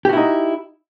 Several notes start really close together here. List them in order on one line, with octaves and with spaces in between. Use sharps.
G4 F#4 E4 D#4